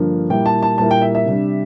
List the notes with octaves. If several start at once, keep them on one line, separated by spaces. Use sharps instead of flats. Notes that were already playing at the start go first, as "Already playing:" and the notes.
Already playing: G2 D3 F3 A#3
A#2 G3 A#3 E4 G5
A5
A5
A#2 G3 A#3 E4 A5
G5
E5
E5
C3 G3 D4